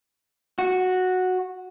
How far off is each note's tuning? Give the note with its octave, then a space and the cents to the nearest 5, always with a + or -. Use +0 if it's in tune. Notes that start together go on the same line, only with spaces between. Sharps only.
F#4 -5